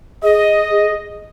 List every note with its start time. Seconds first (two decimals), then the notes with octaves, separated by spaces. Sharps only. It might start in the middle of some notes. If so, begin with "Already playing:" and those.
0.23 G#4 D#5